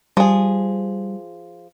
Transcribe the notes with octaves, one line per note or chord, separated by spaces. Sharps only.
F3 G3 G#4